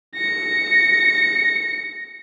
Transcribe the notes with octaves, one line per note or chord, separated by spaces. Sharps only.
A#6 C#7